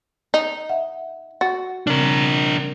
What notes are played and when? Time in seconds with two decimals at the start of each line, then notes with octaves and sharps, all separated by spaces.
0.34 D#4
0.69 E5 F#5
1.41 F#4 A6
1.87 C#3 G3 C4 D4 A#4